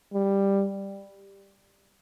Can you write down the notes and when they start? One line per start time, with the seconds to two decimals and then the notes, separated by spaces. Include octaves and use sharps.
0.14 G3